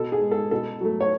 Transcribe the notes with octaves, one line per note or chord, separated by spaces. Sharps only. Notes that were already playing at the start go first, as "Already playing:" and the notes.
Already playing: B2 A4
G#4
G#3
A4
B2 A4
F#3 A3
C#5